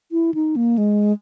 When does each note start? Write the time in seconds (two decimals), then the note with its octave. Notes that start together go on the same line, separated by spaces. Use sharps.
0.12 E4
0.34 D#4
0.56 A#3
0.78 G#3